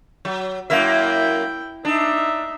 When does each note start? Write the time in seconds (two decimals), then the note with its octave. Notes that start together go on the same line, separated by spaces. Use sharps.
0.25 F#3
0.70 F#2 A#3 E4 E5 G5
1.85 D4 D#4 E5